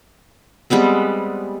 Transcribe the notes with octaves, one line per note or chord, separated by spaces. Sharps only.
G3 G#3 B3 C4